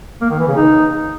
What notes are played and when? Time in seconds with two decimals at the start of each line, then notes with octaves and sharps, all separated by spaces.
0.21 A#3
0.30 D#3
0.39 E3
0.47 C#3
0.56 D#4